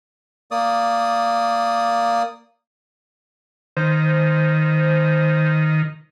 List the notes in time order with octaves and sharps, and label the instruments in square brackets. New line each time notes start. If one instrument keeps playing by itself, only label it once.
[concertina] A#3 D5 D#6
[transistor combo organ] D#3 [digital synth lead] C5